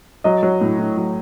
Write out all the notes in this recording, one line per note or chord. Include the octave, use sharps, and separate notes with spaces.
F#3 D#5
F#3
A2
A2
F#3